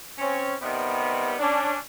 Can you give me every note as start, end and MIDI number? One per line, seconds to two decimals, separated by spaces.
0.18 0.54 60
0.18 0.54 61
0.61 1.34 48
0.61 1.34 51
0.61 1.34 55
0.61 1.34 59
1.39 1.75 61
1.39 1.75 62